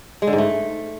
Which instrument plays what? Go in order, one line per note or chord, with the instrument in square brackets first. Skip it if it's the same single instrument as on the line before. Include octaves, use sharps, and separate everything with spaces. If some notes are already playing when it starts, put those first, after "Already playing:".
[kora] G#3
D3
G#2
A3